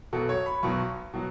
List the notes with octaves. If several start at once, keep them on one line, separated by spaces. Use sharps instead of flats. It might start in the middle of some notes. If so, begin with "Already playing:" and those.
B1 B2 F#3 A4
C#5
B5
B1 B2 F#3 C#6
B2 F#3